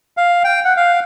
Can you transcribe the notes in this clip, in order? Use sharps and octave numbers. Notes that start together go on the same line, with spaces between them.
F5
G5
F#5
F5